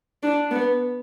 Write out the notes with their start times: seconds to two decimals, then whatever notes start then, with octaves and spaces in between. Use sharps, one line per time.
0.23 D4
0.51 B3